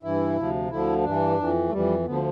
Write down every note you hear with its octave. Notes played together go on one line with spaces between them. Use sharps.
G2 E3 E4
D2 C3 F3
D2 D3 F3 E4
G2 E3 D4
F2 E3
A3
F2 E3 G3
D2 D3 F3 B3